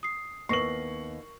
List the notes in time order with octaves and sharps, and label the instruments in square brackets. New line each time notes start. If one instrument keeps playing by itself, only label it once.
[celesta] D#6 C7
[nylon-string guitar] D#2 B3 D#4 [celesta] A#4 A#6 C7 [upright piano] C#6 F#7